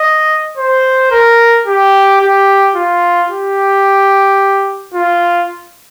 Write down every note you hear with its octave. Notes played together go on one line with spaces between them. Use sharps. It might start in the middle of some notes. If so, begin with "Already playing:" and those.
Already playing: D#5
C5
A#4
G4
G4
F4
G4
F4